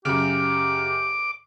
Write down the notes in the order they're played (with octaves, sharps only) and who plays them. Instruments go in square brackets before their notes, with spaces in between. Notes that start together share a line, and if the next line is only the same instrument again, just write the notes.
[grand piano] F#2 C#3 [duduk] G4 [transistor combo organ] D6